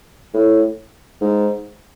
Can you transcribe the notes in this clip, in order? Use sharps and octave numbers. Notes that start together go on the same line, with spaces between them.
A2
G#2